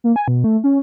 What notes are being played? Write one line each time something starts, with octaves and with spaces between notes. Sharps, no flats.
A#3
G#5
B2
A3
C#4